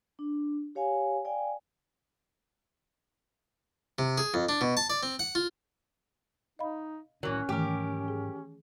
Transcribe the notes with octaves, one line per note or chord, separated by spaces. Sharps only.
D4
G4 C#5 F5 G#5
D5 F5 G5 G#5
C3
G#4
F2
D4
B2
A5
D5
C4
F#5
F4
D#4 D#5 F5 B5
A2 D#3 E3 F#3 C#4 A#4
G#2 D#3 E3 F#3 A3 G4 A#4
G#4